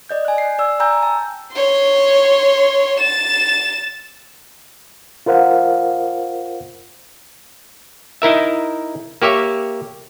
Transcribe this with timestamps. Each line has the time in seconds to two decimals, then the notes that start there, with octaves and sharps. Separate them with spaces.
0.09 D5 D#5 G6
0.25 G#5 F#6
0.38 C7
0.59 D5 E6
0.80 G5 G#5 A#5 E6 G6
1.03 A5
1.53 C#5 C6
3.00 A6 E7
5.26 F4 A#4 C5 F5 F#5
8.22 D#4 E4 A#4 E5
9.22 A#3 G4 C#5 E5